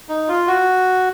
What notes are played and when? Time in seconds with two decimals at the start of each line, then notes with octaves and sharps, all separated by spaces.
0.09 D#4
0.28 F4
0.47 F#4